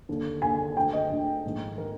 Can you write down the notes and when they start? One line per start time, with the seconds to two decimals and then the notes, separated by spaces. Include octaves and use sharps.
0.09 D#2 D3
0.42 D#2 D3 G#5
0.76 D2 D3 G5
0.93 D#5
1.10 D2 D3
1.44 A#1 G#2 D#3
1.78 D#3 A#4